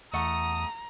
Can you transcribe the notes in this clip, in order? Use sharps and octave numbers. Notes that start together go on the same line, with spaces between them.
E2 A3 F#5 A#5 D#6